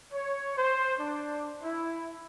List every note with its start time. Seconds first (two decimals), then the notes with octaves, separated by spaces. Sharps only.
0.13 C#5
0.57 C5
0.99 D4
1.63 E4